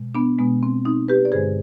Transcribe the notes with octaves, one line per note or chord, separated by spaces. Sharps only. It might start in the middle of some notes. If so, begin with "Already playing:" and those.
Already playing: B2 G#3
B3 D4
B2 G#3 B3
C4
C4 D#4
G4 B4
D5
G2 D3 G#3 G#4 C5